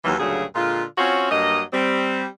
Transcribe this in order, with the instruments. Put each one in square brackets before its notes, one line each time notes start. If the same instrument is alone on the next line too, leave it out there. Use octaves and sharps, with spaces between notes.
[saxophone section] D#2 E3 F#3
D2 G2 A#2 C#3 F#3 G#4
A#2 D3 G#3 F4
C4 C#4 F4 F#4 C#5
G2 F#3 A#3 D#5
G3 C4